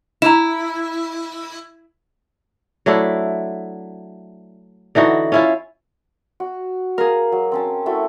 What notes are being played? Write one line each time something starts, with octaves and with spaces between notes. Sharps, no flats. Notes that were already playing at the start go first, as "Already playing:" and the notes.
E4 A#5 E7
F#3 A3 D4 E4
D3 E3 D#4 F#4
C#4 E4 F4
F#4
G#4 A#4 F5
F#3
C4 C#4 A5
A3 E4 F#4